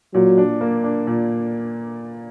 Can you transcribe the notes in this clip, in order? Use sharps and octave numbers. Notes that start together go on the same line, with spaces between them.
A#2 F#3
D4
A#3
D4
A#2